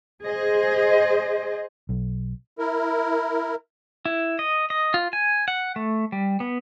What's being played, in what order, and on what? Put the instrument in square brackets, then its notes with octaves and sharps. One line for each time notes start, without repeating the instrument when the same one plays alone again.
[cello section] G#4 C5 D#5
[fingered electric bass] B1
[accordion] E4 A#4
[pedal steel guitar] E4
D#5
D#5
F4
G#5
F#5
A3
G3
B3